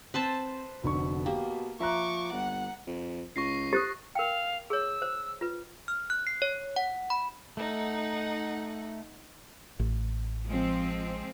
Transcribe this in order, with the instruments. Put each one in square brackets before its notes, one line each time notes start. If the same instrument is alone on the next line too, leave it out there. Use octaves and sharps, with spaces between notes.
[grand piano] C4 [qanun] B4 C5 A5
[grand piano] F1 D3 C#6 [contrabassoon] B2
[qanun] A#3 [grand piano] G4
[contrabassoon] F3 [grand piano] E5 A#5 F#6 [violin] C#6 D6
[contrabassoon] G1 [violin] F#5
[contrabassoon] F2
[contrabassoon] C#2 [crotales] C#6 A#6 C7
[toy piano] G4 [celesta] D#6 F#6 A6
[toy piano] A#4 G5 [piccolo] F5
[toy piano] G#4 C#5 [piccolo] E6
[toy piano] C5
F4 B4
[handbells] F6
F#6
C7
C#5
F#5
B5
[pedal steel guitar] A3 [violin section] D#4 F#5
[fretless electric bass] A1
[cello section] F3 G#3 C4